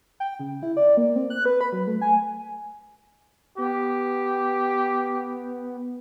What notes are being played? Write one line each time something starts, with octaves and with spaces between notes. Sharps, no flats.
G5
C#3
E4
D5
A#3
C4
F#6
B4
B5
F#3
A3
G#5
B3 G4